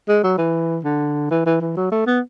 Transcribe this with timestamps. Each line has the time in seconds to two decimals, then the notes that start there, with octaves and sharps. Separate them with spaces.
0.08 G#3
0.23 F#3
0.38 E3
0.84 D3
1.31 E3
1.46 E3
1.61 E3
1.77 F#3
1.92 A3
2.07 B3